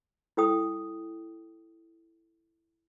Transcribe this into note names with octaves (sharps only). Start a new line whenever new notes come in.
E4 A4 G5 D#6